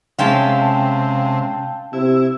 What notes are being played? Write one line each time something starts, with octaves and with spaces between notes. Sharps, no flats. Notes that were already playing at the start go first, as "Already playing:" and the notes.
C3 G#3 C#4 E5 F5 G5 A5
C3 E4